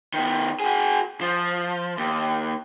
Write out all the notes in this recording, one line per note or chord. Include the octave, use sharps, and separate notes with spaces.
D#3 B3
F#4 G#4
F3
D#2